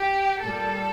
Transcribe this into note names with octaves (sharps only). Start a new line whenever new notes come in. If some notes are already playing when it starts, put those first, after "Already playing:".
Already playing: G4
A#2 G3 A4